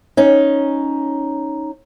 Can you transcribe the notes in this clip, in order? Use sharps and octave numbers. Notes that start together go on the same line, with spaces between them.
C#4 D#4